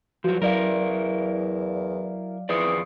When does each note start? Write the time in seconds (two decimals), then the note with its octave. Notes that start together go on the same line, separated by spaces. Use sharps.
0.24 E2 F3 F#3 F#4
0.42 F#3 E4 A#4 D5 F5
2.49 F2 E3 G#4 D5 D#6 C7 C#7